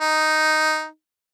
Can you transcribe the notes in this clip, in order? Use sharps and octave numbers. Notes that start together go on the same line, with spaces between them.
D#4